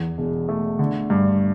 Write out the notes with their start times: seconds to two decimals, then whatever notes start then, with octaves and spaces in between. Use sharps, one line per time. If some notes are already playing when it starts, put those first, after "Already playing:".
Already playing: E2
0.18 E1
0.49 A3
0.79 D3
1.10 G2